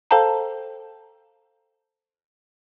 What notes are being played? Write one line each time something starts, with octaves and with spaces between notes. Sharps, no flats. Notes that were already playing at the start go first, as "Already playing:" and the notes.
A4 C5 F5 G5 A5 A#5